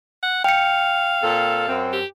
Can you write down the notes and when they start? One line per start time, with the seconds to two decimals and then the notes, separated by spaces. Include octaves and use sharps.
0.23 F#5
0.44 F5 G5 C#7
1.23 A#2 C4 A4
1.67 F#2 C4
1.93 G4